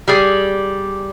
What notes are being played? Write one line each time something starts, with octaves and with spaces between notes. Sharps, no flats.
G3 G#4 D5